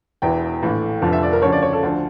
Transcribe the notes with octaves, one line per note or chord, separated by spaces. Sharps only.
E1 E2 E3 G5
A#1 A2 E3
F1 F2 D3 F3
E5
D5
A#4
D2 C#3 F3 C#5
D5
C#5
A4
D2 D3 F3